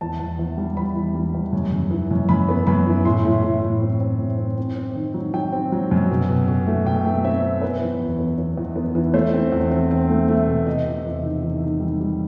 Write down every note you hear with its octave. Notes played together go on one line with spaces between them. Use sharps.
E2 A5
E2
E2
G3
E2 B5
E2
G3
E2
F#2
F#2
E3
F#2
F#2 B5
B3
F#2 B5
E3
A2 C6
A2
A2
A2
C4
C4
A2
C4
C4
C4
D#3
F#3
F#3 G5
C4
F#3
F#2
B2
B2
B2
A3
B2 G5
A3
C4 E5
C4
B3 B4
E3
E2
B3
B3
E2
B3
E3
A3 C5
C4
E2
C4
C4
A3
A3
B2
C3 D#5
C3
E2
D#3
E2
D#3
G3
G3